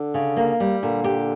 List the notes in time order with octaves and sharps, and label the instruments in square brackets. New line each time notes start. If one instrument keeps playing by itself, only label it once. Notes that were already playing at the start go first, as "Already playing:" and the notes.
Already playing: [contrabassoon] D3
[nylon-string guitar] C#3
A#3
G3
[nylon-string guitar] A#2 [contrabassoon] D3
[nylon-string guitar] G4